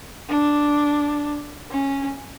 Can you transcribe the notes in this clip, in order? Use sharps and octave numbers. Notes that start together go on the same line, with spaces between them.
D4
C#4